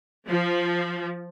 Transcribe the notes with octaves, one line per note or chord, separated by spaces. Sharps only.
F3